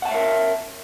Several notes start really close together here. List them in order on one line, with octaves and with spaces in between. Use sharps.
F#5 A5 E5 C#5 A#4